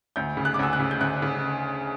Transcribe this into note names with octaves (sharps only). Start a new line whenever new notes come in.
D2 G6
C#3
F#6
D6
D2 E6
F#6
C#3
G6
D2 F#6
C#3